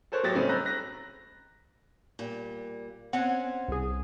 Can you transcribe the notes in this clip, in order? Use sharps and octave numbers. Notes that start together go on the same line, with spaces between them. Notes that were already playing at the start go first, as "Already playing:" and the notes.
A4 A#4 C5 C#5 F#6
A1 F#3 G4 A6 A#6
C#3 G3 A3 C4 C#4 D#4
A#5 B5 E6 F#6 G6 A#6
F#6 A#6
A#2 G3
C4 C#4 F#5 G#5
C2 G#4